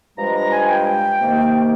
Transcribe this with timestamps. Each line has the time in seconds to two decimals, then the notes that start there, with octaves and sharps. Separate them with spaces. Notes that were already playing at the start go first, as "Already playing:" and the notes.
0.16 G2 F3 G#3 A#5
0.34 A#5
0.50 G#5
0.63 G#5
0.67 G5
1.19 C3 D#3 A#3